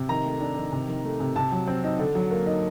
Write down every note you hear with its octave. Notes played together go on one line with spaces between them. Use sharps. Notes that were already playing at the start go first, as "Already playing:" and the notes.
Already playing: C3
D#3 A#5
A3
D4
D#3
C3
D#3
A3
C3
C3 A5
F#3
C4
D#4
D3
F#3
A#3
D#4